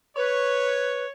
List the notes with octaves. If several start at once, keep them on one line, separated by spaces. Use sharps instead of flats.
B4 C#5